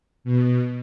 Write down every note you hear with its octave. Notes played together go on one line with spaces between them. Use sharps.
B2